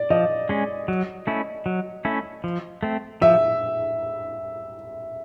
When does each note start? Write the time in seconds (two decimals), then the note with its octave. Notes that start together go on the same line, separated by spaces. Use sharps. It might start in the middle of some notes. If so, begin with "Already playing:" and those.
Already playing: D5
0.10 F3 D#5
0.49 G#3 C#4
0.88 F#3
1.27 A3 C#4 E4
1.66 F#3
2.05 A3 C#4 E4
2.44 F3
2.83 A3 C4
3.22 F3 E5